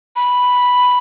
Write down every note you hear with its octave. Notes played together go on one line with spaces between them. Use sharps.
B5